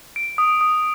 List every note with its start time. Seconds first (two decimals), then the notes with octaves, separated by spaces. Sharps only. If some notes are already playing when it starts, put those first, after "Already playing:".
0.16 D7
0.38 D#6
0.61 D#6